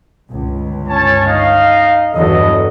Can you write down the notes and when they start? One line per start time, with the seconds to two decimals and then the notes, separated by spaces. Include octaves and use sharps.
0.29 G1 C#2
0.88 C#4 C#5 A5
1.25 D#4 D#5 F5
2.12 E2 G2 F#3 A4 D#5